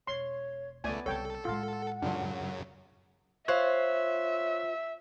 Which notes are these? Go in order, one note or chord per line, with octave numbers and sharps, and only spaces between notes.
E1 C#5 C6
C#2 A3 B3 D5 G#5
C2 C#3 A4 C#5 G5
A2 G#3 F4 F#5
F#2 C#3 F#3 D4 F4
F4 C5 C#5 E5 F#6